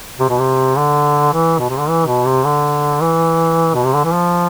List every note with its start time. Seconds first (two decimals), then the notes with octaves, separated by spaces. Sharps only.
0.20 C3
0.29 B2
0.39 C3
0.76 D3
1.33 E3
1.59 B2
1.70 C3
1.79 D3
1.89 E3
2.07 B2
2.26 C3
2.44 D3
3.01 E3
3.75 B2
3.85 C3
3.94 D3
4.04 E3
4.14 F3